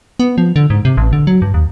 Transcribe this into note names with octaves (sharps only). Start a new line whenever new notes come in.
B3
F3
D3
G#2
C3
A1
D3
F#3
G2
D#2